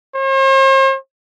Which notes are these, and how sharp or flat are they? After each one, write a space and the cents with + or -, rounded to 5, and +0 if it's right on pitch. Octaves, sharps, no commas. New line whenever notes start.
C5 +45